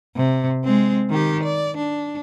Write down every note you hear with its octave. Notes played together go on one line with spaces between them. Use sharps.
C3
G#3 C4
D#3 G4
D5
D4